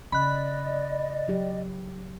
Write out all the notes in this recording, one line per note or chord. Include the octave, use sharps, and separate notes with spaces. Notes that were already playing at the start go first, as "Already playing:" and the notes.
C#3 D5 D#5 B5 F#6
F#3 G4